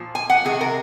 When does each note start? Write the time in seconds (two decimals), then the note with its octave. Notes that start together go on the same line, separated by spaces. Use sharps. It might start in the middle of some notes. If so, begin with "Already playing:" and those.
Already playing: A#2 F3
0.15 G#5
0.30 F#5
0.44 C3 D#3 G#3 G#4
0.61 A#4